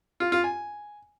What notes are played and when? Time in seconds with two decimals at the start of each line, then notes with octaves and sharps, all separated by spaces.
0.20 F4
0.32 F4
0.44 G#5